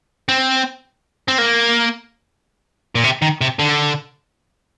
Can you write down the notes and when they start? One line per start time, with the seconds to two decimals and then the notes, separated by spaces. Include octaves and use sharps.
0.29 C4
1.28 C4
1.38 A#3
2.95 A#2
3.04 C3
3.22 D#3
3.41 C3
3.59 D3